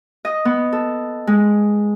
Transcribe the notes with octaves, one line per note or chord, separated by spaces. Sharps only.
D#5
B3
A4
G#3